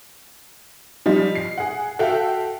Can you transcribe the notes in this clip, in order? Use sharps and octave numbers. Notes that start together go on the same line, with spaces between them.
F3 G3 D#5
C7
G#4 F#5
F#4 A4 E5 F5 G5